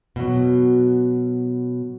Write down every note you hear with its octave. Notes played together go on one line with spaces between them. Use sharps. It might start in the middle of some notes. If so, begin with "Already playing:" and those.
B2 F#3